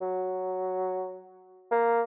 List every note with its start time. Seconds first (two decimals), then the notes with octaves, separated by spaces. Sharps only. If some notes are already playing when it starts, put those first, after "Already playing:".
0.01 F#3
1.71 A#3